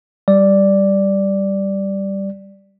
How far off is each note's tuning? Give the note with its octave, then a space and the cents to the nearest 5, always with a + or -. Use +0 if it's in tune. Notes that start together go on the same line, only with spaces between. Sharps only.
G3 +0 D5 +0